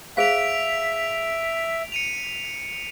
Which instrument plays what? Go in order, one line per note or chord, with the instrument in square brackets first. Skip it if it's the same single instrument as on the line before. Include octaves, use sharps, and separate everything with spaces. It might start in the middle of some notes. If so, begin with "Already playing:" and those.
[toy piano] G#4 C5 F5 [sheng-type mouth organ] E5 [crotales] B6 D7 F7
[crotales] C#7 D#7 F7